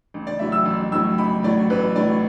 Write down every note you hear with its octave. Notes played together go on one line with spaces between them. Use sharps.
A1
D5
A2 F#3 E5
E6
A1
A2 F#3 E6
A1 B5
A2 F#3 D5
A1 B4
A2 F#3 D5